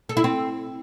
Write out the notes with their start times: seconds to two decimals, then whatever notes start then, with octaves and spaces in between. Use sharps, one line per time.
0.09 A4
0.17 E4
0.24 C4